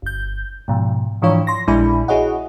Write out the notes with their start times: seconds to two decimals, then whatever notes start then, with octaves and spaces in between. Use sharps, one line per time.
0.02 G1 G6
0.68 G#2 B2 F3
1.22 G#2 E3 F3 D4 F4 C#5
1.47 C6 A#6
1.67 A#1 G#3 D4 E4 G#4 B5
2.08 E4 F#4 G#4 C#5 D#5 F#5